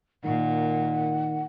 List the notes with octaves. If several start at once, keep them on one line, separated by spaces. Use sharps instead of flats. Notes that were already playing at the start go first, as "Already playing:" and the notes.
A#2 D#3 F#5